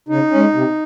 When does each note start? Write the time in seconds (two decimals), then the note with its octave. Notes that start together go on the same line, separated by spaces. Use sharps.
0.09 C#3 D#4
0.31 G#3 C#4
0.54 C3